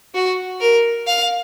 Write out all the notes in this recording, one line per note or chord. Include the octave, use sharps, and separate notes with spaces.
F#4
A#4
F5